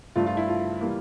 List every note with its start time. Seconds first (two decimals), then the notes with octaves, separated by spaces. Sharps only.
0.16 G2 F3 A3 F4
0.27 F4
0.37 E4
0.48 F4
0.81 E3 G3 A#3